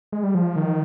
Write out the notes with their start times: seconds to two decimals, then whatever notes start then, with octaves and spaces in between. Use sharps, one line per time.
0.12 G#3
0.23 G3
0.35 F3
0.56 D#3